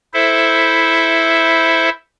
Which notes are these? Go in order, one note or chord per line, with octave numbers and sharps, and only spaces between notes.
E4 A4 C5 E5